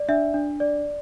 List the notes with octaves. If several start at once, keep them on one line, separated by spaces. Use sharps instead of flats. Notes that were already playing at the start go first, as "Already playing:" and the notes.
Already playing: D5
D4 E5
D4
D5